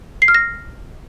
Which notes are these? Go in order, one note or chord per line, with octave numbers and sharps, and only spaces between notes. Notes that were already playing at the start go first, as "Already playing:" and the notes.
C7
F6
A#6